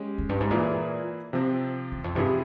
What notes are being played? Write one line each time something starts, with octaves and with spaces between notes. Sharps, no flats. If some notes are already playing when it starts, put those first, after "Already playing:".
Already playing: G#3 C#4 G4
F2
G2
G#2
A#2 E3 A#3 E4 G#4
C3 F3 C4
E2
F2
G2 C3 F3 C4 E4 G#4